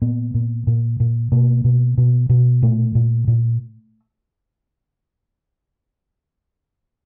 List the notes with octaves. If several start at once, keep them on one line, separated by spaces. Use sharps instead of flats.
A#2 B3
A#2
A#2
A#2
B2 A#3
B2
B2
B2
A#2 A3
A#2
A#2